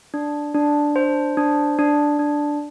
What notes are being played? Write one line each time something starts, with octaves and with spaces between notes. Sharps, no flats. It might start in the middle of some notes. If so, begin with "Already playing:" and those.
D4
D4
C5
D4
D4
D4